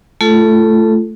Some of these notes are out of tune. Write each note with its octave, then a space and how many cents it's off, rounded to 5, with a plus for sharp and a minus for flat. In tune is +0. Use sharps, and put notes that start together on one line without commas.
A3 +0 F4 -30 A4 -5